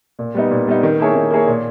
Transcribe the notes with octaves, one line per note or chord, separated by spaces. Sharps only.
A#2
G3 B3 D#4
A#2
G3 B3 D#4
D#3
A#3 E4 G#4 C#5
D#3
A#3 E4 G#4 C#5
A#2